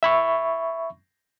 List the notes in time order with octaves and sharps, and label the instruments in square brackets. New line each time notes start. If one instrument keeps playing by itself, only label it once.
[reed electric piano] E5 B5 C#6